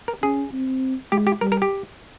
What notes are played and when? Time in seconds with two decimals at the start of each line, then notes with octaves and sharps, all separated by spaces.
0.08 A#4
0.22 C#4 G#4
0.53 C4
1.12 G#3 G4
1.27 G4
1.41 G3 A#4
1.52 A#4
1.62 G4